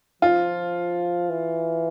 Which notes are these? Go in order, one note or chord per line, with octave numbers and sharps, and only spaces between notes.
F3 F4
E3